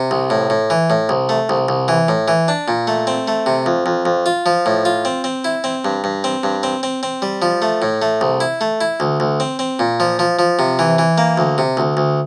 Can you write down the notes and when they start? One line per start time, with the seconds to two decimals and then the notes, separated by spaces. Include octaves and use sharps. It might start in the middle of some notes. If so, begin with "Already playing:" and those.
Already playing: C3
0.11 C2
0.30 A2
0.50 A2
0.70 E3
0.90 A2
1.09 C2
1.29 A3
1.49 C2
1.68 C2
1.88 E3
2.08 A2
2.28 E3
2.48 D4
2.68 A#2
2.87 A3
3.07 C4
3.28 A3
3.46 C3
3.66 F2
3.86 F2
4.05 F2
4.26 F4
4.46 F3
4.66 A2
4.85 F4
5.05 C4
5.24 C4
5.44 E4
5.64 C4
5.85 G2
6.04 G2
6.24 C4
6.43 G2
6.63 C4
6.83 C4
7.03 C4
7.22 G3
7.42 F3
7.62 A3
7.82 A2
8.02 A3
8.21 C2
8.40 E4
8.61 A3
8.81 E4
9.00 D2
9.20 D2
9.40 C4
9.59 C4
9.79 A#2
10.00 F3
10.19 F3
10.39 F3
10.59 C3
10.79 E3
10.98 E3
11.18 A#3
11.37 D2
11.58 C3
11.77 D2
11.97 D2